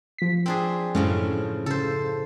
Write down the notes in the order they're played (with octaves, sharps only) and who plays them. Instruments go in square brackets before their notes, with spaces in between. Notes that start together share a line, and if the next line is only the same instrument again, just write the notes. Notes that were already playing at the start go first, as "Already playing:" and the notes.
[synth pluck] F3 B6
[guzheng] C4 D4 G#4
[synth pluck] F#2 G#3 [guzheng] A2 C#3 F3
[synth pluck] C#3 [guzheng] A4 C5